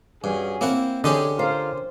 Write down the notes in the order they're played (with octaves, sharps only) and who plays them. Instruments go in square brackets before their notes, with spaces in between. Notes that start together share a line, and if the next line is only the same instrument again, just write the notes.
[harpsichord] G2 [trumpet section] C#4 F#4 G#4
[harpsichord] A#3 E4 F#5 [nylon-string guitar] C4
[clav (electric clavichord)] D3 [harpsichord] C#4 G4 D#5 [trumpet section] G#4
[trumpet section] F4 A#4 F5 [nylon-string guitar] C5